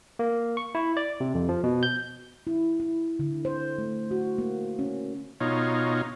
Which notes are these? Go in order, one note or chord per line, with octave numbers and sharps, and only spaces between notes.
A#3
C#6
E4
D5
C3
F2
F3
B2
G6
E4
E4
D3
C5
A3
F#4
A#3
C#4
B2 D#4 F4 C#5